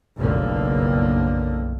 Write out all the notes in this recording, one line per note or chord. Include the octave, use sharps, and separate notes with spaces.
F#1 B1 F2 A2 D3 A#3